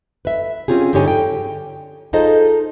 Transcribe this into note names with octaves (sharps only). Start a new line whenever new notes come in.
B4 E5
C4 C#4 F4 G4 G#4
G2 D3 D#4 G4 C#5 G#5
G5
D#4 F4 G#4 A4 C5 D#5